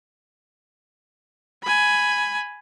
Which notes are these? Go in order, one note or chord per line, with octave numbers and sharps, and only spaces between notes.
G#5 B5